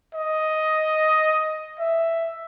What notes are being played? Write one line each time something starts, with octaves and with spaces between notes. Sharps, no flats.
D#5
E5